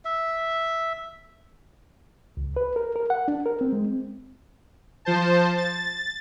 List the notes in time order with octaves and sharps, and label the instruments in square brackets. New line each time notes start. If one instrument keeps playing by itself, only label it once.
[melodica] E5
[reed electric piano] C#2
B4
A#4
A#4
F#5
D4
A#4
C4
G#3
C4
[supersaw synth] F3 C5 A5
A6